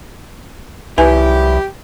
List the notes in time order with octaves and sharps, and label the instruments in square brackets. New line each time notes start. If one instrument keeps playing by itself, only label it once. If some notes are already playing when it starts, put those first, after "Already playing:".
[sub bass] C2 [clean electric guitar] F#2 E3 E4 [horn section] G4 [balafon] B4 G#5